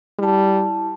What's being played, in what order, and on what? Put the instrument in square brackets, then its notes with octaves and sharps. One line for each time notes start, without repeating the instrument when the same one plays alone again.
[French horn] G3 [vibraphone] E4 A5